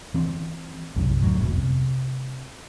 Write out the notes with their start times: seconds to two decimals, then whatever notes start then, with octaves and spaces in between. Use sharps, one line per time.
0.14 E3 C4
0.96 B1 F#2 C3 D#3
1.22 D2 A2 F#3 G#3
1.39 F1 C2 B2
1.55 C3